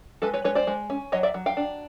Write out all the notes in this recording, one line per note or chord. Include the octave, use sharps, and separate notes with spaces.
G#3 A4 B4
B4 C#5
G#3 B4 C#5
C5 D5
G#3
C#4
F#3 C#5 D#5
D5 E5
F#3
F5 G5
D4